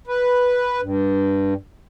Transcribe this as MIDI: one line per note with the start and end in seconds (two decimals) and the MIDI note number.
0.07 0.81 71
0.81 1.54 43